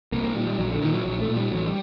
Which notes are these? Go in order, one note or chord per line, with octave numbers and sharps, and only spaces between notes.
C2 A#3
A#3
A#2 G3
G3
A#1 F#3
D3
A#2 D#3
F#3
A#1 F#3
A3
A#2
G3
A1 F#3
G3